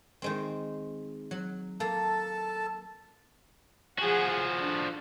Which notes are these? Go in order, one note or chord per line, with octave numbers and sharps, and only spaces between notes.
D#3 G#3 C4
F#3
A#3 A4 A5
F3 F#4 G#4 F#5
D4 A4